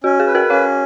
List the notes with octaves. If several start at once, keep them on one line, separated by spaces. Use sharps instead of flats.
C#4 F#4
G#4
B4
F#4 A#4
C#4 C#5 F5